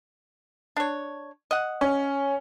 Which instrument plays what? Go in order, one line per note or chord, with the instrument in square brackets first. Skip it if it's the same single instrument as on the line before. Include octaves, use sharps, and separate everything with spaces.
[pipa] D4 C#5
D#5 F#5
[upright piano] C#4